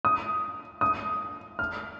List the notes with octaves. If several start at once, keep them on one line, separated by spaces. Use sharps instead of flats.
D#6
D#6
F6